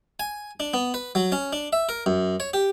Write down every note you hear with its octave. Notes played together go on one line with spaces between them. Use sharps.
G#5
D4
B3
B4
F#3
C#4
D4
E5
A#4
F#2
C#5
G4